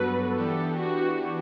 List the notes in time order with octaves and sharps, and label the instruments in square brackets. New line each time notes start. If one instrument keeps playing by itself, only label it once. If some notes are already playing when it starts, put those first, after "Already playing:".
Already playing: [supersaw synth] G2 F#3 B3 F#4 A4 [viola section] B4
[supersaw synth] E3 B3 D4 G4 [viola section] A4
[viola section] F#4